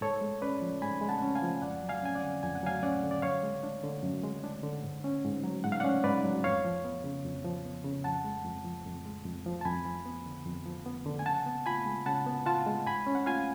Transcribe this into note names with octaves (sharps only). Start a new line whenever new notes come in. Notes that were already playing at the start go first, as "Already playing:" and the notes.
G#2 A4 C#5
G#3
C#4 B4 D5
F3
G#2 G#5 B5
G#3
F#5 A5
C#4
F5 G#5
F3
F2 D5 F#5
F#3
F5 G#5
C#4 G#5
D5 F#5
D3
F2 G#5
F#5
F#3 F5 G#5
C#4 D5 F#5
D3
D5
F#2 C#5 F5
G#3
D4
D3
F#2
G#3
D4
D3
G#2
C#4
G#2
F#3
G#2 F#5
F5
C#4 D5 F#5
G#2 B4 D5
F#3
F2 C#5 F5
F3
B3
C#3
F2
F3
B3
C#3
F2 F#5 A5
G#3
F2
F3
F2
G#3
F2
F3
A5
F2 G#5 B5
F3
B3
D3
F2
F3
B3
D3
G#5
C#3 F#5 A5
B3
F4 G#5 B5
G#3
C#3 F#5 A5
B3
F4 F#5 A5
G#3
G#2 G#5 B5
C#4
F#5
F4 F5 G#5